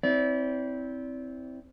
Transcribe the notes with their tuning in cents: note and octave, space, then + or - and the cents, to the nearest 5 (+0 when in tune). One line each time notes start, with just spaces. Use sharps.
C4 +0 E4 -20 D5 -35